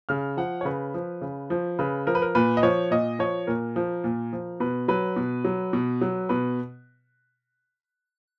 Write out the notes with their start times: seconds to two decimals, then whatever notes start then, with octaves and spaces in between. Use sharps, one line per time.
0.09 C#3 F6
0.37 F3 F#5
0.61 C#5
0.65 C#3 B4
0.94 F3
1.22 C#3
1.50 F3
1.79 C#3 B4
2.07 F3 A#4
2.15 B4
2.22 A#4
2.35 A#2 B4
2.57 D#5
2.63 F3 C#5
2.91 A#2 D#5
3.19 F3 C#5
3.47 A#2 A#4
3.76 F3
4.04 A#2
4.33 F3
4.60 B2 B4
4.88 F#3 B4
5.16 B2
5.44 F#3
5.73 B2
6.01 F#3
6.29 B2 B4